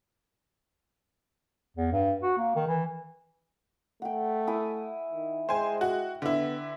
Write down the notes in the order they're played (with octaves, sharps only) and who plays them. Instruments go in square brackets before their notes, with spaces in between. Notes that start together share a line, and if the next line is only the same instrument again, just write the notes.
[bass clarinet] E2
G2
F#4
A#3
D#3
E3
[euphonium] A3 [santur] F#5 G5
[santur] E4 G#5 D#6
[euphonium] D#3
[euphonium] G#3 [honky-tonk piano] C5 G#5 [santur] G5
[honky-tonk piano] F#4
[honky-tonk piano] D3 E4 [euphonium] B3